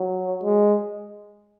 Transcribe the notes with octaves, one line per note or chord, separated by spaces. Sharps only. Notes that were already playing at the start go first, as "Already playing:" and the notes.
Already playing: F#3
G#3